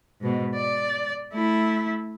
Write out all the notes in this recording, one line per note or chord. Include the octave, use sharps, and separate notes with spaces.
G#2 B2
D5
A3 E4